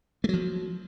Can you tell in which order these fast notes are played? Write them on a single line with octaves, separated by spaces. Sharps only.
A3 F#3 F3